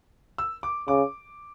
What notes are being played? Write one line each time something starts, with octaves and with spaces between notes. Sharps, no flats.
E6
D6
C#3 D6